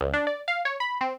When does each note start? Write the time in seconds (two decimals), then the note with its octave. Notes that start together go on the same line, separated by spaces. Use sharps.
0.01 C#2
0.13 D4
0.27 D5
0.48 F5
0.65 C#5
0.80 B5
1.01 C4